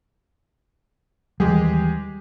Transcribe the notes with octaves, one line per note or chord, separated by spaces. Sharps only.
D#2 D#3 E3 G3 G#3 G4 G#4